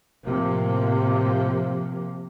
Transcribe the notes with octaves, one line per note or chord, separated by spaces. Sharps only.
A2 C3 F3 A#3